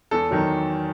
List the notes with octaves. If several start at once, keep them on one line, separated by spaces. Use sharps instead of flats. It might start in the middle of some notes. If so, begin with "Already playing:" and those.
E2 A4
D#3 F#3